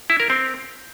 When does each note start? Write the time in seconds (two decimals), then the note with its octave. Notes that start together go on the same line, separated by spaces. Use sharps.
0.10 E4
0.20 A#4
0.30 C4